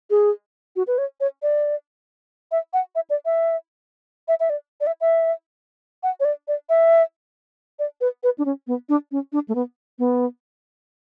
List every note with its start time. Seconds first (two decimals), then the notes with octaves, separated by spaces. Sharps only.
0.10 G#4
0.76 F#4
0.87 B4
0.98 C#5
1.20 C#5
1.42 D5
2.52 E5
2.73 F#5
2.95 E5
3.10 D5
3.25 E5
4.28 E5
4.40 E5
4.50 D5
4.81 D5
4.87 E5
5.01 E5
6.03 F#5
6.20 C#5
6.25 D5
6.48 D5
6.69 E5
7.79 D5
8.01 B4
8.23 B4
8.38 D4
8.45 C#4
8.67 B3
8.89 D4
9.12 C#4
9.32 D4
9.48 A3
9.55 B3
9.99 B3